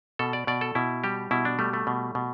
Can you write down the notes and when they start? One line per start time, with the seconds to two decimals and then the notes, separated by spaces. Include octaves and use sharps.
0.19 B2 A4
0.33 D5
0.47 B2 D5
0.61 A4
0.75 B2 E4
1.04 G3 G4
1.31 B2 E4
1.45 D4
1.59 G3 A3
1.73 A3
1.87 B2
2.15 B2